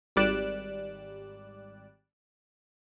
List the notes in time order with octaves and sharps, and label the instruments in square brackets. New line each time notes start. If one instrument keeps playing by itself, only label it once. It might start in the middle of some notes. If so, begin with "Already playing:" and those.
[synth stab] G#1 G3 D5 F#6 D7 E7